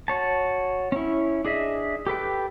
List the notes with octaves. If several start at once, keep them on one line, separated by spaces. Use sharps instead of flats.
F#4 C#5 A5
C#4 E4
D4 G#4 D#5 E5
G4 A4 B4 G5